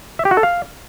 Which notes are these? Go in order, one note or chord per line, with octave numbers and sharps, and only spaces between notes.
E5
G4
F#4
A4
F5